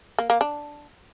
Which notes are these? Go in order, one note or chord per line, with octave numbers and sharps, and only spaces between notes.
A#3
A#3
D4